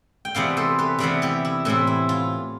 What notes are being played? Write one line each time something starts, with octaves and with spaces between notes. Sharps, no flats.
G5
C3 E3 B3 D5 F5
A4 C5
G4 B4
C3 E3 B3 D5 F5
E4 G4
E4
A2 E3 A3 C4 E4
E4
F4